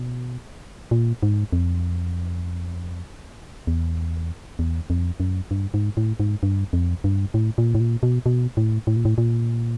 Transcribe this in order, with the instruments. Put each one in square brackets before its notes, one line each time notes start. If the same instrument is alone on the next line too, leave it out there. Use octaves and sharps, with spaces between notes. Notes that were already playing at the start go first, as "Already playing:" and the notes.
Already playing: [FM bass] B2
A#2
G#2
F2
E2
E2
F2
F#2
G2
G#2
A2
G#2
G2
F2
G2
A2
A#2
A2
A#2
B2
B2
A2
A2
A#2
A2
A#2